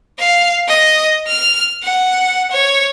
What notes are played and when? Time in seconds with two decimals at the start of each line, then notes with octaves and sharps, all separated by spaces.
0.19 F5
0.68 D#5
1.28 F6
1.83 F#5
2.51 C#5